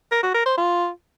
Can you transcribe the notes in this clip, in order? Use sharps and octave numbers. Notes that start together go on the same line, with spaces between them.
A#4
F#4
A#4
C5
F4